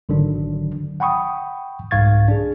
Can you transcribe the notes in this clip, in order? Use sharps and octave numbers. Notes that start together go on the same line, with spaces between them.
G#1 D3 D#3 F#3 D4
F#5 G5 B5 C#6 D#6
C2 G#2 F5 C#6 G#6 A6
D4 G#4